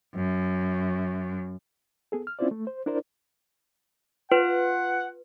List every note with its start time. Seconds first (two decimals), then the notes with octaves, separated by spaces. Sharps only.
0.15 F#2
2.12 B3 G#4 A4
2.27 F6
2.39 C4 C#4 E4 F4 C5 D5
2.51 A3
2.67 C5
2.86 D4 E4 A#4 C5 D5
4.32 F4 B4 F#5